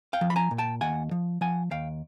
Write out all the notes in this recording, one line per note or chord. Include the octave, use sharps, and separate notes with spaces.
F5 G5
F3
B5
G#5 A#5
A#2
G5 A5
D#2 F#5 G#5
F3
F3 F#5 G#5
D#2 F5 G5